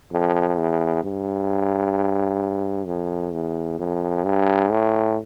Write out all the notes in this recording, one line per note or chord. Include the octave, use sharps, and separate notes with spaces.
F2
E2
G2
F2
E2
F2
G2
A2